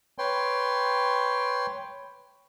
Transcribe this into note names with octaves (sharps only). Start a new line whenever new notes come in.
B4 C#5 G5 C6